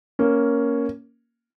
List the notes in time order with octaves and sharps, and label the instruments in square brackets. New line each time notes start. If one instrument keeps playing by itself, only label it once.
[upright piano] A#3 C#4